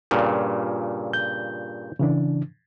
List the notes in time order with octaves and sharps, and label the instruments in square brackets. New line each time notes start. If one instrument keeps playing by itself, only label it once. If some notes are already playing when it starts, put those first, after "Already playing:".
[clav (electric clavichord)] G2 A#2 C#3
[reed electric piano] G6
C#3 E3 D4